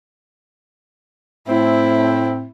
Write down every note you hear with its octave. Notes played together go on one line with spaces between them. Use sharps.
A2 C4 E4